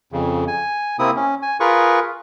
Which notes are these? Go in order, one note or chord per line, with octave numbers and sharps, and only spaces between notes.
F2 C#3
G#5
C3 A#3 C4 E4 D#6
C#4
G#5
F4 G#4 A#4 B4 C#6